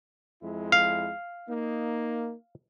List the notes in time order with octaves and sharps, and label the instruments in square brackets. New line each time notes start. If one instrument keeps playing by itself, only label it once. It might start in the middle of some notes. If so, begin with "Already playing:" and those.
[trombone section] F2 G#3 E4
[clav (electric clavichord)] F5
[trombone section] A#3 D#4